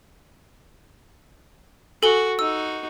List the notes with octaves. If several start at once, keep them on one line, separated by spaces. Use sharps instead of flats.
F#4 A4 G#5 G7
D#4 F#4 E6